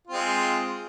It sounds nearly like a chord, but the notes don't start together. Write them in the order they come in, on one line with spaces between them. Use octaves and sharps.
F4 C4 G#3